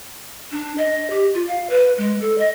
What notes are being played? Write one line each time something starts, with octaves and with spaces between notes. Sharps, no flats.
D4
D#5
G4
F4
F5
B4
G#3
A4
D#5